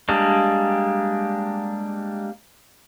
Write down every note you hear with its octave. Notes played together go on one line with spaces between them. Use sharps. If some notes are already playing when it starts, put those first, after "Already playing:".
G3 G#3 A#3 D4